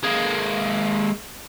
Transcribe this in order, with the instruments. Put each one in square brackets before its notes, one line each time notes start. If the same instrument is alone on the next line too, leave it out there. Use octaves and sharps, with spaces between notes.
[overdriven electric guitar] G#3 A#3